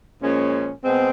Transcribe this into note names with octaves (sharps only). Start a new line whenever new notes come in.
A#2 F3 G#3 C#4
B2 G#3 C4